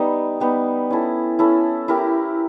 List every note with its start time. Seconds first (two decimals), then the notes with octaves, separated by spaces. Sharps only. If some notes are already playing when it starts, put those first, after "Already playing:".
Already playing: G3 B3 D#4
0.40 G3 B3 D#4
0.90 C#4 E4 A4
1.39 C#4 E4 A4
1.88 E4 G4 A#4